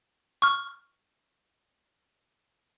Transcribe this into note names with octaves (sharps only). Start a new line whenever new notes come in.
C#6 F6